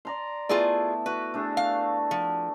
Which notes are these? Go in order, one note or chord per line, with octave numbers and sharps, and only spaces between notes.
D5 A#5 C6
A3 B3 E4 F4 G#4 D5
F#4 B4
A3 D4 G#4
F5
F3